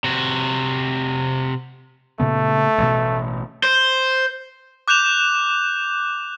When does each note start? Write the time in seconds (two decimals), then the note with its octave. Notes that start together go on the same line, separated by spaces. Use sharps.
0.04 C3 F#4
2.20 A#2 C#3 A3 B3
2.78 A1 B2
3.63 C5
4.88 D6 F#6 G6 E7 F7